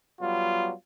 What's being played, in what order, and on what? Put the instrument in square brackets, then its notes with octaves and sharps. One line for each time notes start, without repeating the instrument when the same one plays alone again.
[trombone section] F#3 G3 B3 F4